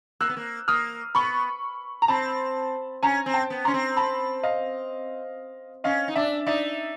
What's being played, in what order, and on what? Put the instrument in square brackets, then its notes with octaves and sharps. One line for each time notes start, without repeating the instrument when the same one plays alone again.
[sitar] A#3 [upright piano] E6 F#6
[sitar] B3
A#3
[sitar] A#3 [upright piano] D#6 F6
[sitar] B3 [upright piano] B5 C#6
[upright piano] A#5
[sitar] C4 [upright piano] A5 B5
[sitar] C#4 [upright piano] G#5 A#5
[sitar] C4
[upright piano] G5 A5
[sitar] B3
[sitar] C#4 [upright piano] A#5 C6
[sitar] C4
[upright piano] A5 B5
D#5 F5
[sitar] C#4 [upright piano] D#5 F5
[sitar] D#4
[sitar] D4 [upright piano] D5 E5
[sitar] D#4 [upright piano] D5 E5